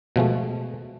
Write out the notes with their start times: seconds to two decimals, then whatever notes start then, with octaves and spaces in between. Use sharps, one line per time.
0.16 B2 F3 G#3 A3